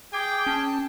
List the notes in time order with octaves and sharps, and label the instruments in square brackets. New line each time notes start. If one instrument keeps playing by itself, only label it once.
[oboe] G#4 [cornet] G5 [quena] D6
[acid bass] C#4 [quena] A5